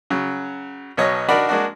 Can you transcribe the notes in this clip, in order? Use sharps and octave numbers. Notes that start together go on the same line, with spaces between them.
C#3 F#3
B1 B2 F#3 C#5 D#5
D4 D#4 F#4 A#4 D5 B5
G#3 A#3 D4 F#4